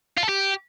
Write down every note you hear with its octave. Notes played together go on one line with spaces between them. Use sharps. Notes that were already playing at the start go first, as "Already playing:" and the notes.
F4
A4
G4